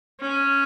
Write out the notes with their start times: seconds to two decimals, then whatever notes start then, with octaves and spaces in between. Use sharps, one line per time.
0.21 C#4